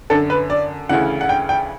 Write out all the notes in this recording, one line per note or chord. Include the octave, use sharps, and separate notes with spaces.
F#2 D3 A4
B4
D5
D2 C#3 E3 F#5
F#5
G5
G5